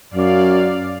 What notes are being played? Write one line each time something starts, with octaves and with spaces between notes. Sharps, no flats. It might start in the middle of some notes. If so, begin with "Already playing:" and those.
F#2 D5 F5